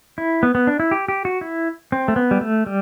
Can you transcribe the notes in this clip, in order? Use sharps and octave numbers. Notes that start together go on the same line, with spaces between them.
E4
B3
B3
D4
E4
G4
G4
F#4
E4
C4
A3
B3
G3
A3
G3